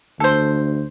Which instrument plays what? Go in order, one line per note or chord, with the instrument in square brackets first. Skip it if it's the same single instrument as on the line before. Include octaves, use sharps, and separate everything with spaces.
[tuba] D2 [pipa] A4 C5